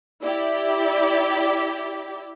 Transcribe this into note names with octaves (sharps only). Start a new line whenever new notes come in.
E4 G4 D5